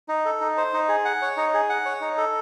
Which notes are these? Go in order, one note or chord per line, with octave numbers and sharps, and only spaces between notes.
D#4
A4
D#4
C5
D#4
G#4
F#5
C#5
D#4
G#4
F#5
C#5
D#4
A4